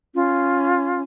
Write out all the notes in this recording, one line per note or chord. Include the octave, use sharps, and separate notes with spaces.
C#4 F4